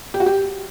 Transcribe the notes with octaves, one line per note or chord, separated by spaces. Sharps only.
G4
F#4
G4